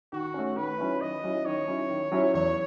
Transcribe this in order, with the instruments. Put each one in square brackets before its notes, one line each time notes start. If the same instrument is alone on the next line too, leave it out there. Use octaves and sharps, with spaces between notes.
[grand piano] D#3 [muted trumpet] F#4
[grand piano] A3 C#4
[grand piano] D#3 [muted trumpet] B4
[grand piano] F#3 C#4 E4
[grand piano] D#3 [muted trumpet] D#5
[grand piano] F#3 C#4 E4
[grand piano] D#3 [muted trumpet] C#5
[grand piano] F#3 C#4 E4
D#3
F#3 C#4 E4
[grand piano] E2 [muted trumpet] C#5